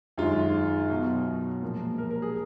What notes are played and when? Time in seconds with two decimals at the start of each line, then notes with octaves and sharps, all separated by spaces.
0.18 F#2 D#3 G#3 F4
0.90 B2 F#3 F#4
1.63 A#2 F3 G#3 A#4
1.98 A#4
2.11 A#4
2.22 G#4